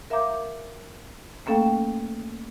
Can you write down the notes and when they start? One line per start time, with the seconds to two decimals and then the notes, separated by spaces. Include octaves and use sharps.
0.10 A#4 E5 F5 A#5 D6 G6
1.46 A3 A#3 C#4 A4 F5 G5